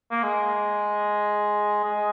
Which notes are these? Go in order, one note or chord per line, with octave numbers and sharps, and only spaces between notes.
A#3
G#3
G#3